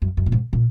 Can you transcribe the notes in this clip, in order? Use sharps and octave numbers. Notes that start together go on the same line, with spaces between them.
F#2
F#2
A#2
G#2
A#2